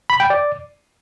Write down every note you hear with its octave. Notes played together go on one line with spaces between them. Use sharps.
B5
G5
D5